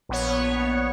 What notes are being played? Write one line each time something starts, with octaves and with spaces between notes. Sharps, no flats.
A#1 B3 C#5